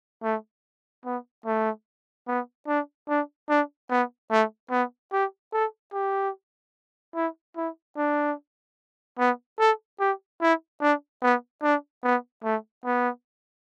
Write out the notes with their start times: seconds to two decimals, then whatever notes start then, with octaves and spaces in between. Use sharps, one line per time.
0.23 A3
1.05 B3
1.46 A3
2.27 B3
2.68 D4
3.09 D4
3.49 D4
3.90 B3
4.31 A3
4.71 B3
5.13 G4
5.53 A4
5.93 G4
7.15 E4
7.56 E4
7.97 D4
9.19 B3
9.59 A4
10.00 G4
10.41 E4
10.81 D4
11.22 B3
11.63 D4
12.03 B3
12.44 A3
12.85 B3